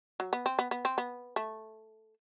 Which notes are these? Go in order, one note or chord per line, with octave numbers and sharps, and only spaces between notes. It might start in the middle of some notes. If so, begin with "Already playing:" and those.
F#3
B3
C4
B3
B3
C4
B3
A3